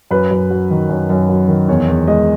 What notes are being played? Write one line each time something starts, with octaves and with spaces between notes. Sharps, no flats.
F#2 B4
F#2
F#3
D#3
F#2
F#2
F#3
D#3
E2 C#5
E2
G#3 D#5